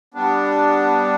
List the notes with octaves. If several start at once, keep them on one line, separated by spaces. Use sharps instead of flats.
G3 B3 D4